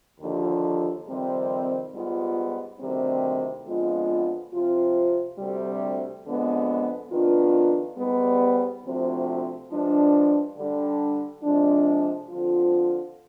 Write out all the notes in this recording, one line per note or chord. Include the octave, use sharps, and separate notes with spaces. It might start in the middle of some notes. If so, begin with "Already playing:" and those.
D#2 D3 F3
F2 C3 D#3 G3 C4
G#2 G3 B3 F4
D2 C3 D#3 G3 C4
F2 D3 G#3 B3 F4
C3 F3 C4 F4
D2 C3 G3
F2 D3 G#3 B3
F2 D#3 B3 D4 F4
G#2 G3 B3
D2 C3 F3 C4
G2 F3 G#3 D4
D3 G3 D4
F2 C3 F3 G#3 D4
D3 F3 C4 F4